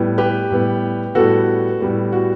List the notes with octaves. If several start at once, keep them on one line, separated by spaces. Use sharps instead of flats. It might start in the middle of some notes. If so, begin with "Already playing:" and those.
Already playing: A2 G3 B3
G4 B4
A2 G3 B3
A2 G3 B3 F#4 A4
A2 G3 B3
F#4